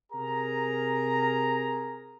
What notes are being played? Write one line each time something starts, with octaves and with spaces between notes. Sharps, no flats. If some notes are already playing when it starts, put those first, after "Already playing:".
C3 G#4 A#4 A#5